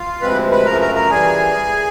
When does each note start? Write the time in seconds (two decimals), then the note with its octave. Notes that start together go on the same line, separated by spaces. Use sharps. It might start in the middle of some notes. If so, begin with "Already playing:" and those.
Already playing: F4 F5
0.22 D2 C3 F3 G#3 C4 B4 B5
0.51 B4 B5
0.65 F#2 C#3 F3 A3 A#4 A#5
0.81 A#4 A#5
0.95 A#4 A#5
1.10 E3 G3 G#4 G#5